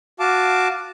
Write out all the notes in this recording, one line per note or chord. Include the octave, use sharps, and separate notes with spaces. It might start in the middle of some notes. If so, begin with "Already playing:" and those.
F#4 F5 A5 D6